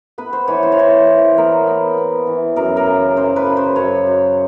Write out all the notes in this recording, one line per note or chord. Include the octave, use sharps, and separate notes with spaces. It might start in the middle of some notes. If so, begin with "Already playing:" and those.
B3 B4
C5
E3 C#5
C5
C#5
E3 C5
E3
B3 A#4
B3
B3
E3
F#2 A#4
A#4
C#3
F#2 C5
B4
C#3
C5
F#2 C#5
F#2